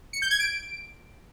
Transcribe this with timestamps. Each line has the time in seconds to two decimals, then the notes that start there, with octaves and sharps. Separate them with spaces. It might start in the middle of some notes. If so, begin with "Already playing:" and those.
0.13 C#7
0.22 G6
0.31 G#6
0.39 D7